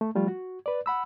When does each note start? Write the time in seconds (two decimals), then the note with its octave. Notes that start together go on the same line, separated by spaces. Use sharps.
0.01 A3
0.15 F3 G3 A3 F4
0.28 F#4
0.66 B4 D5
0.86 F#5 B5 E6